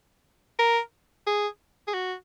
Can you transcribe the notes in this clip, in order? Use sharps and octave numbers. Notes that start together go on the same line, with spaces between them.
A#4
G#4
G#4
F#4